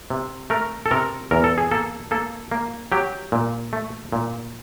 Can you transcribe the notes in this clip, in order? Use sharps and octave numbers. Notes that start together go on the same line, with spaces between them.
C3
A3 A#4
A4
C3 A#4
E2 A#4
A4
G#4
A#3 A4
A#3 A4
A#3
F#3 G4
A#2
A3
A#2